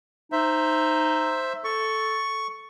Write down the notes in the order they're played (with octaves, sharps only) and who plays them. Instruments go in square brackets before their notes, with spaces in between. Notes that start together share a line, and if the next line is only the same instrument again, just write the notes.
[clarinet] D#4 [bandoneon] C5 E5
[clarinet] A4 [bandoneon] C#6